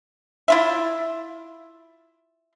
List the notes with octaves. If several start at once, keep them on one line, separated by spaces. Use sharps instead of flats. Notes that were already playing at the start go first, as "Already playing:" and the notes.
E4 F4 E5